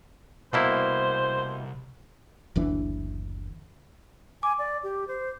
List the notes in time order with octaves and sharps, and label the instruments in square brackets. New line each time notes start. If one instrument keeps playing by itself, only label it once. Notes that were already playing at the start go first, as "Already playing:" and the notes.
[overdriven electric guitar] C2 [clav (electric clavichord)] B2 A#3 E4 [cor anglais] C5
[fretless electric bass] F#1 D2 E3 D4
[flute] G#5 [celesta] D6
[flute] D5
G4
C5